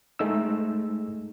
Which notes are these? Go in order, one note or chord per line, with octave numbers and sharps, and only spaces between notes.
G#3 A3 D#4 E6